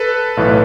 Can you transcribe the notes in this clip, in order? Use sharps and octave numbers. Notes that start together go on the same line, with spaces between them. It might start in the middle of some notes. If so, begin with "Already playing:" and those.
Already playing: A4 B4
B1 A2 E3